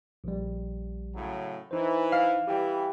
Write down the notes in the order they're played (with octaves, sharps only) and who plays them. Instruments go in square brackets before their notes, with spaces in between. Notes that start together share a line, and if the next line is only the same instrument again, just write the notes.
[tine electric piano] A#1 G3
[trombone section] A2 C#3 F#3
[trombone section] E3 [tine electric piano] D#4 C5
[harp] F5
[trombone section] E3 G3 [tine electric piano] G4 G5